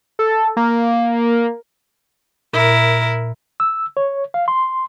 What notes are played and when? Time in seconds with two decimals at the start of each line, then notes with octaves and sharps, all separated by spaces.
0.19 A4
0.57 A#3
2.53 A#2 E4 A#4
3.60 E6
3.97 C#5
4.34 F5
4.48 C6